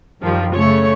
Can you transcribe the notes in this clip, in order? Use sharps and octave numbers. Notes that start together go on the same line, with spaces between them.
F#2 D#3 F3 G3
C#3 A3 C#5